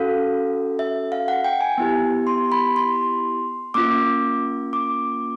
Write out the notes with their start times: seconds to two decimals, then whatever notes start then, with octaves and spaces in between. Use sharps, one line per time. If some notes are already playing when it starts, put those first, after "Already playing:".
Already playing: C#4 F#4 A4 F5
0.79 E5
1.12 F5
1.28 F#5
1.44 G5
1.61 G#5
1.78 B3 E4 G4
2.27 C6
2.52 B5
2.76 C6
3.74 A#3 C#4 F4 D6
4.73 D6